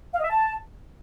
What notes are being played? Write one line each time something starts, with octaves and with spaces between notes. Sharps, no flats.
F5
D#5
E5
A5